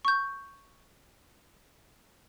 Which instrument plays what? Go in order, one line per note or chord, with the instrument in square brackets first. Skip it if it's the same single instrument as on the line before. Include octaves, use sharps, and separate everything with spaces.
[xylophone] C#6 G6